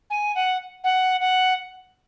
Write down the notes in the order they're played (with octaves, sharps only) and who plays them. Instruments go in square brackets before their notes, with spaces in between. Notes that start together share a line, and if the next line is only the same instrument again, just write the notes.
[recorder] G#5
F#5
F#5
F#5